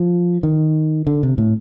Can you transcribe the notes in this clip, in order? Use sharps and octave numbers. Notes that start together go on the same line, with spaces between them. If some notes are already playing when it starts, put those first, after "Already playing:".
Already playing: F3
D#3
D3
C3
A2